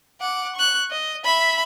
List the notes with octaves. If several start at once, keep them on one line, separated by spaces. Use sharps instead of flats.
F#5 D6
C#6 F#6
D#5
E5 B5